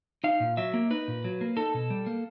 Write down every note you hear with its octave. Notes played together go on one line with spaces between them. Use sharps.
D#4 F5
A#2
F#3 E5
A#3
D#4 B4
A#2
F#3
A#3
D#4 A4
B2
G3
A#3